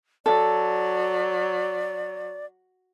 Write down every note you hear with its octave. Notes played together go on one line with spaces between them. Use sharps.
F#3 A4 D5